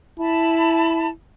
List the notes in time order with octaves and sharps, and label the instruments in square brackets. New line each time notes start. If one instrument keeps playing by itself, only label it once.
[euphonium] E4 [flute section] A5 B5